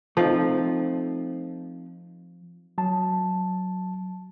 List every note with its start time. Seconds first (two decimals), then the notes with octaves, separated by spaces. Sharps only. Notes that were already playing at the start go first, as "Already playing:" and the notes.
0.17 F3 A3 C4 D#4
2.78 F#3 A5